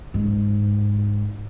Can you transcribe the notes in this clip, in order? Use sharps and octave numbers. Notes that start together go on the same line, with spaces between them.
G#2